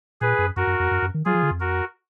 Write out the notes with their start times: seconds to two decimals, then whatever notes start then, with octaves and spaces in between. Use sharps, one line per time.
0.21 A#2 G#4 B4
0.39 F#2
0.56 F#2 F#4 A#4
0.67 F#2
0.80 F2
0.91 F#2
1.02 F#2
1.14 D#3
1.25 F#3 F4 G#4
1.35 F3
1.43 D3
1.51 F2
1.60 F#4 A#4